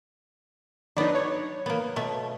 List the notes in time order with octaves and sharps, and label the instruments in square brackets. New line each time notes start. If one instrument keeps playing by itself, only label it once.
[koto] F#3 B3 [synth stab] D4 D#4
[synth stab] C#5
[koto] A#3 B3
B2 A3